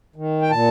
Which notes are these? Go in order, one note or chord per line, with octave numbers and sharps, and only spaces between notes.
D#3
G5
A#2 A5